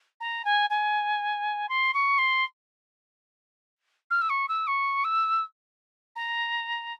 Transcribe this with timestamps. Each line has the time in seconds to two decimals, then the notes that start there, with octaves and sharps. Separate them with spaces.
0.20 A#5
0.45 G#5
0.70 G#5
1.69 C6
1.94 C#6
2.18 C6
4.10 F6
4.21 E6
4.29 C#6
4.48 E6
4.67 C#6
5.04 E6
6.16 A#5